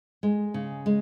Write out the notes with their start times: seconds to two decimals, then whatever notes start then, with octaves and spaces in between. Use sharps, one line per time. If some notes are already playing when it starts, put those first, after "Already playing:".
0.23 G#3
0.54 C#3
0.86 G#3